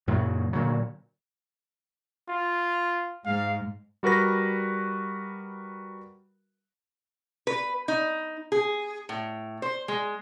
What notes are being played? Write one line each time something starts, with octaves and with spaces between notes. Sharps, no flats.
F#2 A#2 C#3 F#3
A#2 D3 F#3
F4
G#2 F5
G3 F#4 A#4 B4 A#6
B4
D#4
G#4
A2
C5
G#3